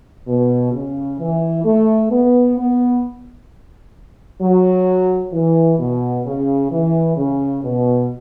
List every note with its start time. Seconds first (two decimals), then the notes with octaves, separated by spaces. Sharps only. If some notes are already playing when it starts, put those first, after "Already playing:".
0.27 B2
0.72 C#3
1.19 E3
1.65 A3
2.11 B3
2.57 B3
4.41 F#3
5.32 E3
5.78 B2
6.25 C#3
6.71 E3
7.16 C#3
7.63 B2